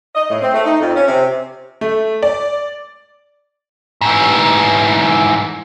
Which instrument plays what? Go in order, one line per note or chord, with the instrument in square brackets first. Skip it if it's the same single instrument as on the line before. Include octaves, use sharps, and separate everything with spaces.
[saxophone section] D#5
A2
C4
A3
D#4
F2
C#4
C3
[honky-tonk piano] A3
D5
[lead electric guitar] G#2 E3